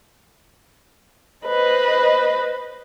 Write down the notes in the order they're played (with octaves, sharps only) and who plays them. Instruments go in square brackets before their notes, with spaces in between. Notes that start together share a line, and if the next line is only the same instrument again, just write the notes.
[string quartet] B4 C5 D#5